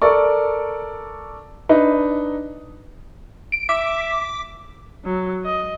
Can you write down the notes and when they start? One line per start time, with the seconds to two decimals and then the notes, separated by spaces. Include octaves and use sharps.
0.02 A4 A#4 D5 C#6
1.69 D4 D#4 B4
3.52 D7
3.69 E5 D6 B6
5.05 F#3
5.45 D#5